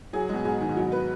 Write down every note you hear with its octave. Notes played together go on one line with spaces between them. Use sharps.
F#3 G#4
B2 G#3
G#2 G#4
D#3
G#2
B2 F#3
B4